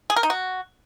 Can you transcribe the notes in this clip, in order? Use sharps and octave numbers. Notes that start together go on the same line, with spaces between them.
G#4
A#4
D#4
F#4